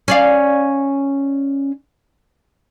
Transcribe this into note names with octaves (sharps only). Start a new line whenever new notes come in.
C#4 D5 F5